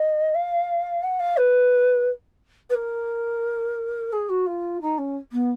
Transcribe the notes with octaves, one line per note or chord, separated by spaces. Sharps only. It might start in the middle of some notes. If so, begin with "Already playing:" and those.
Already playing: D#5
F5
F#5
F5
B4
B4
A#4
G#4
F#4
F4
D#4
C#4
B3